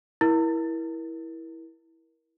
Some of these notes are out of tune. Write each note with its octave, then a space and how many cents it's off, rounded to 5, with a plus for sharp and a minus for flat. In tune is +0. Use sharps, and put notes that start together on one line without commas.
E4 -10 A#4 +25